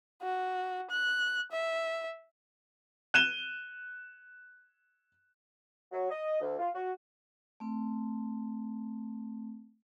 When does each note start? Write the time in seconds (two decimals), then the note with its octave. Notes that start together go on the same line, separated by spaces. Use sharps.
0.22 F#4
0.91 F#6
1.52 E5
3.14 F#6 D#7 E7 G7
5.91 F#3
6.10 D#5
6.40 D2
6.58 F4
6.74 F#4
7.60 A3 C4